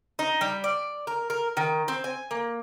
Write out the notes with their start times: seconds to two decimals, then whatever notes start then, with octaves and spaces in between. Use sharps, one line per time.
0.19 D#4
0.41 G3
0.64 D5
1.07 A#4
1.30 A#4
1.57 D#3
1.88 C4
2.04 G#5
2.31 A#3